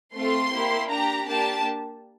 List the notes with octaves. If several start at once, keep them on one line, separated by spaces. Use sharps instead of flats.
A3 C4 F4 A4 C6
A#3 E4 G4
D4 G4 A#5
A#3 D4 G4 A5